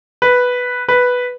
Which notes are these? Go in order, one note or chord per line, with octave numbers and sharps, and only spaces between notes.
B4
B4